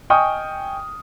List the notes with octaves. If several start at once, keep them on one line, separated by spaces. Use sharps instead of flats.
D#5 G5 G#5 C#6 D#6 F6